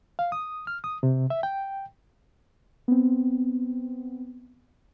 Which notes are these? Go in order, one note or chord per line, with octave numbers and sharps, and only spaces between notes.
F5
D#6
F6
D#6
C3
E5
G5
B3 C4